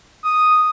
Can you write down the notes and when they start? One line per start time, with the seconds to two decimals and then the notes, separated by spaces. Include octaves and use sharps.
0.24 D#6